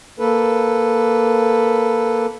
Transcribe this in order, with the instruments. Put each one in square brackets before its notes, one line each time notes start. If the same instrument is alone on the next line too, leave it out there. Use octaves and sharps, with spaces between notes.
[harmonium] A#3 A4 B4